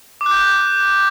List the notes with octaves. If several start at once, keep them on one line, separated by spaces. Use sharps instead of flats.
D6
F#6
G6